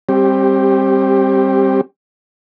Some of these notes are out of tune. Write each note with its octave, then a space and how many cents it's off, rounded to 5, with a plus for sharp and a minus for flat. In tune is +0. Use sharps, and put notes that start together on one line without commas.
G3 +20 C4 +25 G4 +0